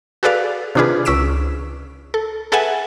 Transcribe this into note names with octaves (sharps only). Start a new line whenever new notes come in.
F#4 G#4 A4 B4 D5 F5
C3 D#3 D4 F4 G#4 B4
C#2 C#4 E6 B6 D7 E7
A4
G#4 A4 B4 E5 F#5 G#5